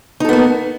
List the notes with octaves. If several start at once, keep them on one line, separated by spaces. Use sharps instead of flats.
A#3 B3 D#4 A4